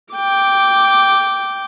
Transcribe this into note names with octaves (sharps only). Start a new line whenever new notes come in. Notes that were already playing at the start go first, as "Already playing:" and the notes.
G5 D6